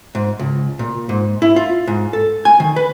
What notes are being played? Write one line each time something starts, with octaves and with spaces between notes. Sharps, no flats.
G#2
C#2
A#2
G#2
E4
F4
G#2
A4
G#5
D#3
B4